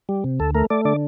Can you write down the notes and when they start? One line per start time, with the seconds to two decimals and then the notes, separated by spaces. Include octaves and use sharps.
0.09 G3
0.24 C3
0.40 D2 A4
0.54 A3 A#4
0.70 A3 D5
0.85 D3 D5